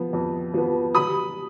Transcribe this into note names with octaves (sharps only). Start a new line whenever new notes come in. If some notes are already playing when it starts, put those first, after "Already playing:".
Already playing: F3 B3
F2
F3 B3
B5 D#6